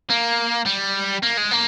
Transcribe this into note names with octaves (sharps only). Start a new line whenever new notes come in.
A#3
G3
A#3
G#3
A#3